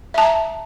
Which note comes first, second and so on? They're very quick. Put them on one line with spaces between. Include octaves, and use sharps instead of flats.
E5 A5 A#5